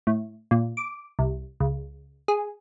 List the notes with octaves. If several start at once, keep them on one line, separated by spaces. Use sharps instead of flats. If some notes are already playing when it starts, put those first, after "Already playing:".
A2
A#2
D6
C2
C#2
G#4